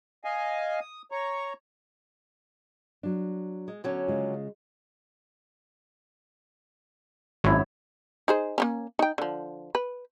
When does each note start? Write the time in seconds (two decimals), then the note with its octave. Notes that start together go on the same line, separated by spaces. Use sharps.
0.24 D#5 F5 G#5
0.80 D#6
1.11 C#5 A#5 C#6
3.03 F#3 D4
3.68 G#3
3.84 D3 F#3 C#4
4.08 C#3 G#3 F4
7.44 G#1 F#2 E4 C#5
8.28 D#4 G#4 C5
8.58 A#3 B3 C#4
8.99 D#4 G5
9.18 D3 F3
9.75 B4